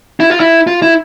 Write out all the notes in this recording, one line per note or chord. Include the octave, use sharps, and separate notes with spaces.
E4
F4
E4
F4
E4